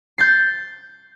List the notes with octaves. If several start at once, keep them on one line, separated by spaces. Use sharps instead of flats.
G6 A6 C7